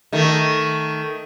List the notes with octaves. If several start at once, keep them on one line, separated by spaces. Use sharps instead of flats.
D#3 A3